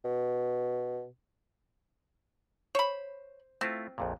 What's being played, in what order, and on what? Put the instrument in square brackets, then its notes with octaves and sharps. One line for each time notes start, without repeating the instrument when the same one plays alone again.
[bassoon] B2
[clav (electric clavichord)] C5 [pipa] C#5 B5
[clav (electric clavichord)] A3 E4 F4 [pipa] C4
[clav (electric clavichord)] A#1 F2 A#2